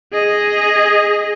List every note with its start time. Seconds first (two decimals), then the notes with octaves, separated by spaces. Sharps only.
0.12 G#4 D#5